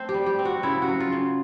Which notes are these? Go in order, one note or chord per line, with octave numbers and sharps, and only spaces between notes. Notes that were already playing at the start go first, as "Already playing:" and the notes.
Already playing: A3 C4 C5
G4
G3
G4
C4
F#4
C#3 E4
F#4
F#3
F4
C#3